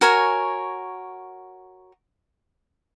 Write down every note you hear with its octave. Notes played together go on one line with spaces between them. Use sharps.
F#4 A#4 C#5 G#5